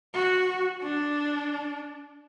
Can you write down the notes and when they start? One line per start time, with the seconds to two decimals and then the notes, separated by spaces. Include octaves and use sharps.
0.14 F#4
0.82 D4